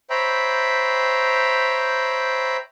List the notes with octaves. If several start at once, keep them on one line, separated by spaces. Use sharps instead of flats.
C5 C#5 E5 G5 A#5 B5